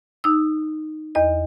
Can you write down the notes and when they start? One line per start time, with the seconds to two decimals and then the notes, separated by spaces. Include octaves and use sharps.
0.24 D#4 E6
1.15 E2 D#5